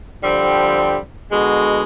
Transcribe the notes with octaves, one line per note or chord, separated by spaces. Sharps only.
D3 F3 G3 C4
B2 D3 G#3